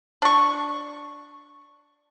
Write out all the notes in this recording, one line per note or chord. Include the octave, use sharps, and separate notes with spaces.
D4 C#6